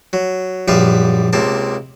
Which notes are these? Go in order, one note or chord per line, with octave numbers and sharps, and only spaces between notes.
F#3
A#1 F#2 G3 B4 E5 F5
C#2 C3 A#3 A5